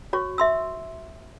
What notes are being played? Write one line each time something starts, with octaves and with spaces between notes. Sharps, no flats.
F#4 C#5 C#6
E5 C6 E6